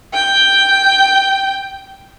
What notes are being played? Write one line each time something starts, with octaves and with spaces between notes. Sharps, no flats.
G5